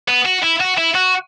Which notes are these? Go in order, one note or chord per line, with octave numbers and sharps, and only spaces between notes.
B3
F#4
E4
F#4
E4
F#4